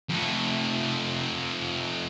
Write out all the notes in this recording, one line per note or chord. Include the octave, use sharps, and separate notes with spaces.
F2 A3